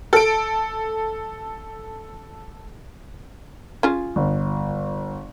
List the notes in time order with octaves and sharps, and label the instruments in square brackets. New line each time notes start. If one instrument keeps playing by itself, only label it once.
[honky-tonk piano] A4 D7
[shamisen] C#4 F4 G#4
[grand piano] G1